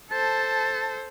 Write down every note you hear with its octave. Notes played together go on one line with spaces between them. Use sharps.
A4 C5 A5